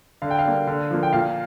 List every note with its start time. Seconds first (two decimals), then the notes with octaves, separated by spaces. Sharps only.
0.22 D3 F5
0.31 G5
0.39 F5
0.45 G3 A#3
0.67 D3
0.91 F3 A#3
1.03 G5
1.13 A#2 F5